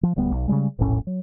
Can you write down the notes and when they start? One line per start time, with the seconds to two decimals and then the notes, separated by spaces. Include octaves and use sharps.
0.03 F3
0.16 D1 D2 G3 B3
0.32 B1
0.48 C#3 E3 G3 G#3
0.79 E1 A#1 A2 C#4
1.07 F#3